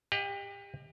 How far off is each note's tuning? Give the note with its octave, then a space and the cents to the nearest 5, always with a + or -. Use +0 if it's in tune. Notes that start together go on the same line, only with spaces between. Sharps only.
G4 +30 D#5 +0 F#5 -20